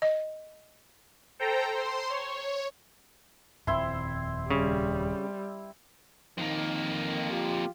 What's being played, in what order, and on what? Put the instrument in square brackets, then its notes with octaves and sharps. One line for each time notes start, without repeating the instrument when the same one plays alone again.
[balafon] D#5
[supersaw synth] A4 C5 G5 A#5
C5 C6
C#5
[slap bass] D#1 F2 [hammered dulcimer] C4 E4 C6
[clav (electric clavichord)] C#3 [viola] G3
[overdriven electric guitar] F2 A#3 [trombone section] D#3
[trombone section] F4 G4